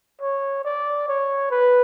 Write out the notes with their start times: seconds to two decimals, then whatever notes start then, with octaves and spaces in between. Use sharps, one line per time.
0.21 C#5
0.65 D5
1.08 C#5
1.51 B4